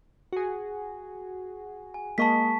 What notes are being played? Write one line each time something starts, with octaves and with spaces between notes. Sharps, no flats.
F#4 G#4
G#5
G#3 A#3 D#5 A5 C#6 B6